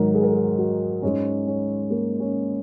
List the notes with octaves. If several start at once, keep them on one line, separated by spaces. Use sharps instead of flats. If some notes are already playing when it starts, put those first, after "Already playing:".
Already playing: G#2 D#3 F#3 A#4
G#4
A#4
G#4
F#4
G#2 G#3 C#4
C#4
A#3
C#4